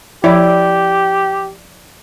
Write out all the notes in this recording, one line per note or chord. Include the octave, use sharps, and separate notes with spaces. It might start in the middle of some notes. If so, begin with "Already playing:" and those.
F3 E4 G4 D5